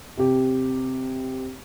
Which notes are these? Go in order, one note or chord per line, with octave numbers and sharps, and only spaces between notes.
C3 G4